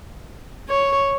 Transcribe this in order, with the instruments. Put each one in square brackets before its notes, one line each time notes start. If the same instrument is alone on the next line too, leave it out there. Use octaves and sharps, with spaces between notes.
[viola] C#5